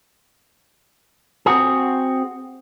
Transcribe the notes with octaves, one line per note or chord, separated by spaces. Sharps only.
C4 F#4 G#4